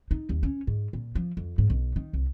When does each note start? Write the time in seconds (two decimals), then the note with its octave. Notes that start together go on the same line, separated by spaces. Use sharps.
0.11 D#4
0.29 D#2
0.43 C#4
0.67 G#2
0.93 A#2
1.15 F3
1.37 F2
1.58 G#2
1.70 B1
1.96 D#3
2.13 C2